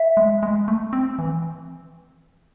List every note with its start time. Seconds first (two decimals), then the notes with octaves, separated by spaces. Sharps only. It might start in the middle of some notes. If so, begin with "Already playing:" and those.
Already playing: E5
0.17 G#3
0.43 G#3
0.68 A3
0.93 C4
1.19 E3